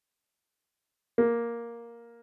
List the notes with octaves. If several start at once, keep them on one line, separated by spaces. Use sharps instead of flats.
A#3